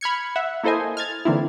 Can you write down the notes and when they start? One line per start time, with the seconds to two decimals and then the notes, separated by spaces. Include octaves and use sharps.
0.01 B5 F6 G#6 C#7
0.36 E5 F#5
0.63 A#3 E4 A4 C5 D#5 G#5
0.97 F6 G#6 A6
1.25 D3 E3 A#3 C4 E4